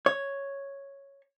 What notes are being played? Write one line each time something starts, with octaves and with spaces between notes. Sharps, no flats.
C#5